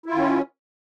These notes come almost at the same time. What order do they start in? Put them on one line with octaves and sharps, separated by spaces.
E4 F4 D#3 C#4